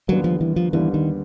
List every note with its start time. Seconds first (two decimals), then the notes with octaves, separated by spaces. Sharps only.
0.08 D#2 D3 F#3 G3 B3
0.24 F3
0.41 E3
0.56 F3
0.73 D#2 D3 E3 G3 B3
0.94 D#3